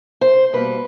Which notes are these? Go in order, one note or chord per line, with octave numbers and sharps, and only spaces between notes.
C5
B2 G3 A#3 B4